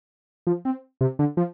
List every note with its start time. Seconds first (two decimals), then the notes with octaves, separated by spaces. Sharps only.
0.47 F3
0.65 C4
1.01 C3
1.19 D3
1.37 F3